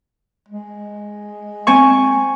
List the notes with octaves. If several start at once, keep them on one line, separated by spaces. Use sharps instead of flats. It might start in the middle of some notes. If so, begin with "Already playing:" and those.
G#3
C4 G#5 C#6